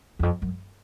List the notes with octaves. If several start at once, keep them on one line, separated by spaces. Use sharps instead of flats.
E2
F2
F#2